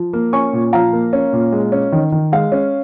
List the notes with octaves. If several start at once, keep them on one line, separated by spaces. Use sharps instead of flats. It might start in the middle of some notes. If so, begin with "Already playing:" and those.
Already playing: F3
A#3
C#4 G#5 C#6
A#2
F3 F5 A#5
A#3
C#4
A#2
G#3
C#4
D#3
D#3
G#3 F5
C#4